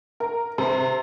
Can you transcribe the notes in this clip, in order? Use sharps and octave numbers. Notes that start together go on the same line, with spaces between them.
A#4
C3